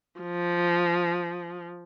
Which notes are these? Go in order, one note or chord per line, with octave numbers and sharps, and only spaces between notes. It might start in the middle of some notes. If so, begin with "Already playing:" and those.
F3